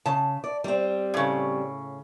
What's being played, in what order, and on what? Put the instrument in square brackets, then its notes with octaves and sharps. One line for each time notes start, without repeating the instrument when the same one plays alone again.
[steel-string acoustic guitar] C#3 [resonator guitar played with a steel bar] A5
[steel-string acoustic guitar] D5
G3 C4
[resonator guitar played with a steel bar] A2 C#3